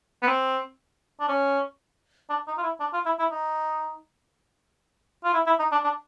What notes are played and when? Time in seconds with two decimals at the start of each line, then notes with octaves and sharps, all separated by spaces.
0.23 B3
0.27 C4
1.20 D4
1.29 C#4
2.30 D4
2.47 D#4
2.58 F4
2.63 E4
2.80 D4
2.93 F4
3.06 E4
3.19 E4
3.31 D#4
5.24 F4
5.34 E4
5.46 E4
5.59 D#4
5.72 D4
5.84 D4